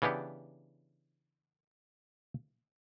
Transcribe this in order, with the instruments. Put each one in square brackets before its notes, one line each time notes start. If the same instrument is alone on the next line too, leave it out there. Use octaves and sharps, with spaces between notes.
[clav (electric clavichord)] C#3 E3 B3 D4 G4